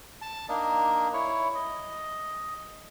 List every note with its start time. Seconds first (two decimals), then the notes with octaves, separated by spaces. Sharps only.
0.22 A5
0.49 A#3 D4 D#4 A#4
1.13 E4 C#5
1.55 D#5